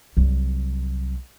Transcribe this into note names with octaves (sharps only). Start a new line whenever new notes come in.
C2 F#3